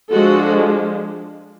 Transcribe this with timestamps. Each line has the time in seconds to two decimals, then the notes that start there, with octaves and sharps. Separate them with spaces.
0.11 F3 G#3 D4 F#4 A4